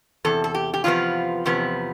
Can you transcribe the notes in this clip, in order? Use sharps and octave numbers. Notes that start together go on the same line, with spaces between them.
E2 C3 A4
A4
G4
G4
E2 C3 F3 B3 F4
E2 C3 F3 B3